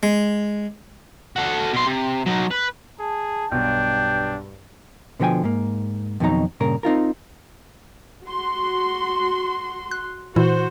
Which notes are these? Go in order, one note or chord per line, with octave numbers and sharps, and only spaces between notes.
G#3
F#4 A4
B2 C6
C3
F#3 D#4
B4
G#4 A5
B1 G2 B2 D4 G5
B2 D3 F3 A#4 G5 G#5
G#2 A#3
F2 B2 D#3 F#3 D#4 A#5
G2 A#2 C#3 A#4
C4 D#4 F4 A#4
F#4 C6
F#6
A#2 E3 E4 F#4 C5